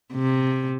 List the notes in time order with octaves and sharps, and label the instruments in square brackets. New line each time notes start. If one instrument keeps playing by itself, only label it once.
[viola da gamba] C3